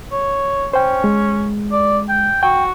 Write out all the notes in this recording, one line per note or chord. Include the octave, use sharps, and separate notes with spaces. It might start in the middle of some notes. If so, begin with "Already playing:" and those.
C#5
C#4 C5 G5
G#3
D5
G5
F#4 G5